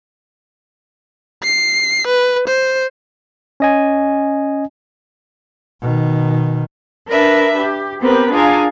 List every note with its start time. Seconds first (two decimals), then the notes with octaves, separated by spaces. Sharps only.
1.43 C7
2.07 B4
2.48 C5
3.60 C#4 D#5 G#5
5.81 B2 D#3
7.09 D4 A#4 B4 E5
7.58 G4
8.01 B3 C4 G4 A#4 B4
8.31 D4 F4 G#4 A#4 F5 G#5